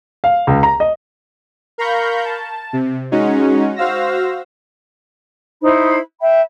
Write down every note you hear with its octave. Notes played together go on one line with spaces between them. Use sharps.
F5
C#2
A#5
D#5
A#4 F5 A#5 B5 C#6 G6
A5
C3
G#3 C#4 D#4 F#4
F#4 C5 F5 E6 A#6
D#4 E4 C5 B5
E5 G5 B5